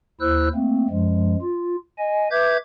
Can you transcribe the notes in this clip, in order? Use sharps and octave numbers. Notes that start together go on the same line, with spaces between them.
D#2 E4 C5 E6 F#6
A3 A#3 C4
F#2 F3 G#3
F4
D#5 G#5
B4 E5 D6 G6 G#6